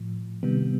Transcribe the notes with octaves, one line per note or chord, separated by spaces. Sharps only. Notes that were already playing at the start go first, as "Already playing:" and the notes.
Already playing: A2 F3
C3 D#3 G3 B3